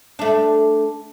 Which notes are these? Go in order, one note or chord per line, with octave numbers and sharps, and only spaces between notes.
A3 D4